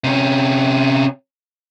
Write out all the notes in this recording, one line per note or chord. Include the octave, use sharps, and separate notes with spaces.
C3 C#4